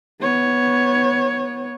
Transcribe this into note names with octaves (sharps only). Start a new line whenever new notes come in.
B3 C#5